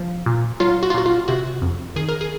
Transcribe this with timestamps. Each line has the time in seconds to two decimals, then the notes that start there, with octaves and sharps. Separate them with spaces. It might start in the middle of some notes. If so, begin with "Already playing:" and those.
Already playing: F3
0.26 A#2
0.60 F#3 F4
0.83 F#4
0.90 F4
0.94 A#2 F#4
1.06 F4
1.28 C3 F#4
1.62 F2
1.96 D#3 G#4
2.09 A#4
2.21 G#4